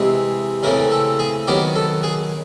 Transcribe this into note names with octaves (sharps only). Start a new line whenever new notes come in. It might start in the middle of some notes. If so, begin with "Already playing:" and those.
Already playing: C3 E3 G#3
C#3 E3 A3 C4 A#4
A4
G#4
D#3 F#3 B3 G4
A4
G#4